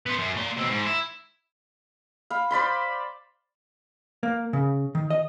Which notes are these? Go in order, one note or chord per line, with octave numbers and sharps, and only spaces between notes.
B3 C5
F#2
A#3 C6
B2 C4
G#2
E4
F5 B5
C5 D5 B5 C6
A#3
C#3
D#3
D#5